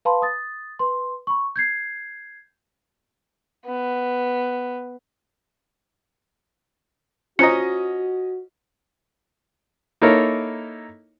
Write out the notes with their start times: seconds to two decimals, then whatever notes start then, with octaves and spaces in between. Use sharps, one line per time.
0.05 B4 F5 A5 B5 C6
0.22 D#6 A6
0.79 B4 C6
1.27 B5 C#6
1.56 G6 G#6 C7
3.66 B3
7.39 C#4 F4 F#4 C5 D#5 A#5 C#7
10.01 A#3 D#4 E4 A4 A#4 C#5